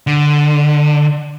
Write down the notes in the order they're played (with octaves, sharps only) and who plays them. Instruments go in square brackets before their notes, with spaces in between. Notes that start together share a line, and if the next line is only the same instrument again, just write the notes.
[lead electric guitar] D3